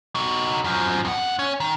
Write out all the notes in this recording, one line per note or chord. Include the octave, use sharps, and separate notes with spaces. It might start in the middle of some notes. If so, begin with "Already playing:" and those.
D#4 F#4
F#2 F3
F2 F#5
C#4
D#3